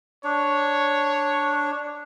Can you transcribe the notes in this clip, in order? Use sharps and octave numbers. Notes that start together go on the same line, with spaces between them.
D4 C#5